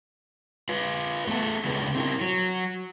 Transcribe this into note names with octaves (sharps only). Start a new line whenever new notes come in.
F4 B4
A3 B3 A4
C#3 G#3 D4 F4 G#4 B4
C4 E4 A#4
F#3